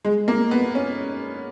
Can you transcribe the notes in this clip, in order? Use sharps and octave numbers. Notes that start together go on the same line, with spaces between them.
G#3
A#3
B3
C#4